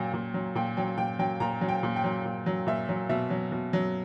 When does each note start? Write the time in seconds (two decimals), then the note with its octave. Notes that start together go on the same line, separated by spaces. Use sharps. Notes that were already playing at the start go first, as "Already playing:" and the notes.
Already playing: A#2 F#3 G5
0.13 A#2
0.34 F#3
0.55 A#2 G5
0.77 F#3 G5
0.97 A#2 G5
1.19 F#3 G5
1.40 A#2 A#5
1.61 F#3
1.69 G5
1.83 A#2
1.96 G5
2.04 F#3
2.25 A#2
2.46 F#3
2.67 A#2 E5
2.89 F#3
3.09 B2 E5
3.30 F#3
3.52 B2
3.73 F#3